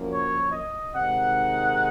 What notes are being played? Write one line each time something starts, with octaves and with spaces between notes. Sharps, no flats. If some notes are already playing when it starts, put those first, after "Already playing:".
Already playing: F#2 F3 A#3
C#5
D#5
C3 D#3 G#3 D#4 F#5